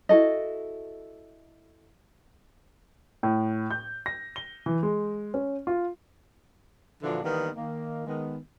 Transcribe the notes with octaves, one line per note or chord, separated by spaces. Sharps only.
E4 F#4 A4 D#5
A2
G6
A#6
G7
E3
G#3
C#4
F4
A#2 D3 E3 F3 D4 F#4
D#3 E3 G3 A#3 B3
D#3 A#3
D#3 G#3 B3